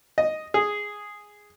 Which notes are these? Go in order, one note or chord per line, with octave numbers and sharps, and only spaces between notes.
D#5
G#4